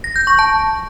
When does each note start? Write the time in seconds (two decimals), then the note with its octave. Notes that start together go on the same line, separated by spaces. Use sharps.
0.04 A#6
0.16 G6
0.27 C#6
0.39 A5